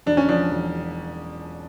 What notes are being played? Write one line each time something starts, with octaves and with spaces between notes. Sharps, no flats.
E1 D4
C#4
F3 D4
E1